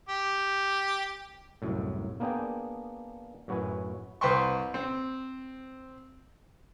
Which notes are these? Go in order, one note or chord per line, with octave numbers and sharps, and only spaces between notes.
G4
C2 F#2 A2
A#3 B3 D4 G#4 G5
F#2 A2 F#4 B4 G#5
C2 B4 C5 G5 C6 C#6
C4